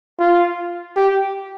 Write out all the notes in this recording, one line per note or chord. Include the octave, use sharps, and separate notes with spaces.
F4
G4